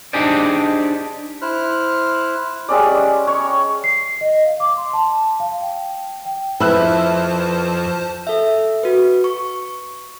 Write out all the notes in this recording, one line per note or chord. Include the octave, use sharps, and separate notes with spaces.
D4 D#4 G4 G#4 C5 D5
E4 C5 F6 F#6
G3 G#3 C#4 D5
C#5 C#6
C7
D#5
F5
D6
C6
A5
F5
G5
G5
F2 E4 B4 C5 A5 E6 F#6
A4 E5
F#4 B4
C#6